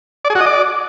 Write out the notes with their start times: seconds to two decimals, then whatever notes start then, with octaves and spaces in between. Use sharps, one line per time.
0.25 D5
0.30 G#4
0.35 F#4
0.41 D#5
0.46 D5